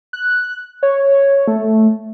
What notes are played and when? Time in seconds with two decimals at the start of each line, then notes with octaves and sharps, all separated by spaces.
0.13 F#6
0.83 C#5
1.48 A3